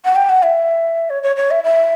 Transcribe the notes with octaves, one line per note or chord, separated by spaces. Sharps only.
F#5
G5
F#5
E5
C#5
C#5
C#5
E5
E5